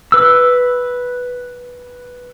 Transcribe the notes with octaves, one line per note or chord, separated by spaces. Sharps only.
B4 E6